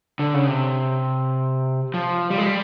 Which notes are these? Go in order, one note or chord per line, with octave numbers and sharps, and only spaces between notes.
D3
C#3
C3
F3
G3
G#3
G3